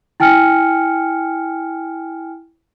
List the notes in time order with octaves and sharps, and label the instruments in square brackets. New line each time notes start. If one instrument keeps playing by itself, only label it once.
[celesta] E4 G5 G#5 F6 C#7